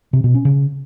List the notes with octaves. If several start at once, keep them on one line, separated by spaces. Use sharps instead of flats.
C3
B2
C#4
C#3